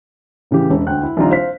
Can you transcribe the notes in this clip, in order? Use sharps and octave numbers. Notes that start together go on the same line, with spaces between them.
A2 C#3 E3 G4
E1 C#4
D2 G5 F#6
E4
A#1 D#3 G3 C4 F4 A#5
C5 F5 B6